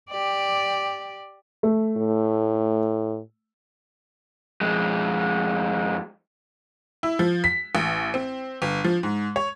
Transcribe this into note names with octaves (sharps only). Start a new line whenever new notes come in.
G4 D5
A3
A2
F2 G#3
E4
F3
B6
A1
C4
G1
F3
G#2
C#5